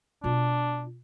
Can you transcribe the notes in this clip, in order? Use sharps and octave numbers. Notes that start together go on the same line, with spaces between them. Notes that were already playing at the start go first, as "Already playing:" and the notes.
B2 D4 F4